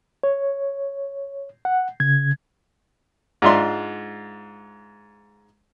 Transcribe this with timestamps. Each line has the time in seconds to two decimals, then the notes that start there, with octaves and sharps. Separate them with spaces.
0.23 C#5
1.65 F#5
2.00 C#3 G#6
3.42 G#2 D4 F4 E5 C6